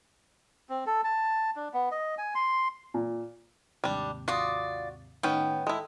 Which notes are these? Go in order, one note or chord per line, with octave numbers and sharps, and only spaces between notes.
C4
A4
A5
D4
B3
D#5
G#5
C6
A#2
D#2 G#2 C3 G3 D4
F4 F#4 D5 D#6
A2 D#3 B3 C#4 D#4 G5
G#3 E4 A4